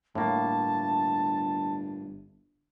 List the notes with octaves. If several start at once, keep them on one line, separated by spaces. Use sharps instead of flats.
G1 A2 A#3 A5